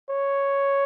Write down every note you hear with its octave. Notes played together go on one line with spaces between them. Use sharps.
C#5